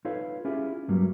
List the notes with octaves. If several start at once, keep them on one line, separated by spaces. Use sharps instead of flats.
D#4 F4 A4 B4 C#5 F5
C#4 E4 F4 G4 G#4
G2 F#3 G3 A#3